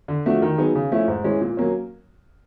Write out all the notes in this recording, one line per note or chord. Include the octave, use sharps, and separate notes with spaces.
D3
F3 A3 D4 F#4
D#3
F#3 B3 D#4 G#4
C#3
F3 A3 C#4 E4
G#2
E3 G#3 C#4
A#2
F#3 A#3 C#4